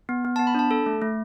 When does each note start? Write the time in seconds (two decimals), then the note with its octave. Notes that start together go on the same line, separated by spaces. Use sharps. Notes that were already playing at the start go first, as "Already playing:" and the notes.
0.09 B3
0.25 B3
0.36 A5
0.39 B3
0.47 B5
0.55 D4 A5
0.71 A4
0.86 A3
1.02 A3